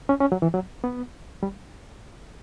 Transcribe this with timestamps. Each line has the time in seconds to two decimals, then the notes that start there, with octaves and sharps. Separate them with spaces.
0.09 C#4
0.20 C#4
0.32 F#3
0.42 E3
0.54 F#3
0.84 B3
1.43 G3